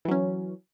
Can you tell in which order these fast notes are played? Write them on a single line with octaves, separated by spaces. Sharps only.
E3 F#3 C#4